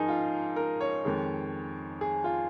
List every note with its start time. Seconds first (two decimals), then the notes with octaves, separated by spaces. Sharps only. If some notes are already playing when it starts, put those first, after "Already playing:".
Already playing: G#2 F3 D#4 G#4 A#4
0.08 F4
0.56 A#4
0.81 C#5
1.05 F2 D#3 G#3
2.01 G#4
2.24 F4